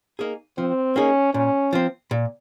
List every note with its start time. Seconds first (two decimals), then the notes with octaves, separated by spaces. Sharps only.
0.19 A#3 D#4 G#4
0.58 F3 C4
0.96 A#3 C#4 D#4 G#4
1.34 A#2 C#4
1.73 F3 C4
2.11 A#2